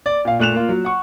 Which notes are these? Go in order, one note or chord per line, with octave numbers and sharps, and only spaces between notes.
D5
A#2 F5
A#2 A3 F#6 E7 F7
A#3 F4
F#3
F#5 C#6